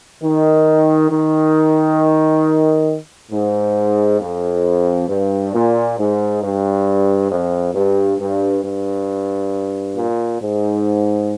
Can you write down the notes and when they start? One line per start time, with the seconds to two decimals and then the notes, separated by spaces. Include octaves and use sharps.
0.22 D#3
1.10 D#3
3.32 G#2
4.20 F2
5.09 G2
5.54 A#2
5.98 G#2
6.43 G2
7.31 F2
7.75 G2
8.20 G2
8.64 G2
9.97 A#2
10.42 G#2